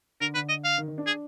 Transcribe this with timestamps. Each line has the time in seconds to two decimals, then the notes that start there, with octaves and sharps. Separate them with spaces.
0.20 D3 A#4
0.35 D3 B4
0.49 D#5
0.64 F5
0.78 D#3
0.88 D#3
0.98 D4
1.06 G#4